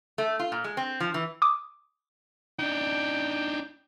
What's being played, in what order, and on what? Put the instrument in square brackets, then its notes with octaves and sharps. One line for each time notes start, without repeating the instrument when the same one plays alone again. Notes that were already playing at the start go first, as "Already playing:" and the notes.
[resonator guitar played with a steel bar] A3
F4
A#2
G#3
C4
F3
E3
[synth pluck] D6 D#6
[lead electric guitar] D4 D#4 [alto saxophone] G5